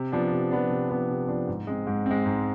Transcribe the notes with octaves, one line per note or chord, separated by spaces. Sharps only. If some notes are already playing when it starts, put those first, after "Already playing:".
Already playing: C3
F3 B3 D4
C3
F3 B3 D4
C3
F3 B3 D4
C3
F3 B3 D4
G#2
G#3 C4
G#2
G#3 C4
G#2